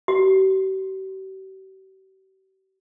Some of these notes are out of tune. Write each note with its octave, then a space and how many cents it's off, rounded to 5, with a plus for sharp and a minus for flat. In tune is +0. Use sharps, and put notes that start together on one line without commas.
G4 -45